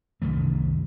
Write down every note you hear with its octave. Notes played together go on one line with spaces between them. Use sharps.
C2 F#2 D#3 A3